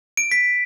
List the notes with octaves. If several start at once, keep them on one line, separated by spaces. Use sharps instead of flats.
D7
B6